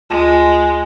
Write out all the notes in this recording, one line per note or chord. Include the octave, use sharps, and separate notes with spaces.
D2 G#3 F4 A5